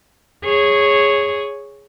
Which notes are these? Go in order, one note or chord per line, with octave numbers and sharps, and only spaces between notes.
G#4 C#5